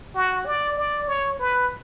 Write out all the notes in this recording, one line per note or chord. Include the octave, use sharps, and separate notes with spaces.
F#4
D5
D5
C#5
B4